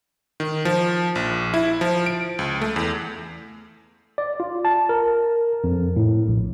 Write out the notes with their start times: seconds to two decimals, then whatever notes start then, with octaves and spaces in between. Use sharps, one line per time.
0.40 D#3
0.65 F3
1.15 A#1
1.54 E4
1.81 F3
2.06 D7
2.39 C#2
2.61 A3
2.76 E2
4.18 D5
4.40 F4
4.65 A5
4.89 A#4
5.64 F2
5.96 A2
6.28 A#1